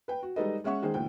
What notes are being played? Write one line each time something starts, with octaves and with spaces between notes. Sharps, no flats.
B4 G5
F#4
G3 G#3 D#4 A4 B4 D#5
G#3 C#4 E5 F#5 C#6
D#3 G#3 G#4 C5
D2 A#2 E3 G5